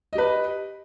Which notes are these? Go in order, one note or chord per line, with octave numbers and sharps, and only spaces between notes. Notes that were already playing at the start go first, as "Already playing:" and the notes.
G4 B4 D#5